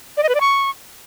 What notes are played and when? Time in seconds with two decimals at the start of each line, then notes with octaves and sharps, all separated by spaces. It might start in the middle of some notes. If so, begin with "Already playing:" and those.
0.17 D5
0.23 D#5
0.29 B4
0.35 D5
0.40 C#6